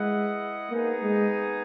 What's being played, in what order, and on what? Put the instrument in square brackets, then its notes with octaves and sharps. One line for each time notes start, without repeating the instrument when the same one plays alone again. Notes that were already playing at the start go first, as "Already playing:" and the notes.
Already playing: [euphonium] G#3 [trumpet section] E4 B4 D#5 F#5
[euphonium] A#3 [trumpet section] B3 D#4 G#4
[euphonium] G#3